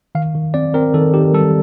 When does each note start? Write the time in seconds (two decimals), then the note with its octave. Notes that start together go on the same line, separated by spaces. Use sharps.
0.15 D#3 F5
0.35 D#3
0.54 C4 D5
0.74 C4 A#4
0.94 D#3 A4
1.14 D#3 G4
1.34 G3 A4